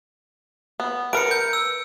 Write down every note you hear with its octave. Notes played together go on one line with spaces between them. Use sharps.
B3
A#4 B4 C#7 D7
G6
E6